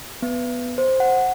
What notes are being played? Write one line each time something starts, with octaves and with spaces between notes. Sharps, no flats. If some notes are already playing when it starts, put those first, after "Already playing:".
B3
C5
F#5